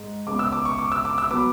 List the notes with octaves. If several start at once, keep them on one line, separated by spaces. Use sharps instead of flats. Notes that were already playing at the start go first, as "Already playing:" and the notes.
Already playing: G#2
C#2 C#3 G#3 B3 D6
E6
D6
C#6
D6
E6
D6
E6
F#3 B3 D6